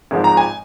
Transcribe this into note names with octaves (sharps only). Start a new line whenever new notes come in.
G#1 G#2 F3 G#3
A#5
G#5